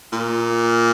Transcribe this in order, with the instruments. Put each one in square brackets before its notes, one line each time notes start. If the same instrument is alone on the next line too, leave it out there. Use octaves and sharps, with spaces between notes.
[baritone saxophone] A#2